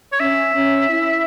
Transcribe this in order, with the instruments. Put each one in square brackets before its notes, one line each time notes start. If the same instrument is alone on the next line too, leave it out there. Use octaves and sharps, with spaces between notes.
[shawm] C#5
[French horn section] C#4 [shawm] E5
[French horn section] C#4
E4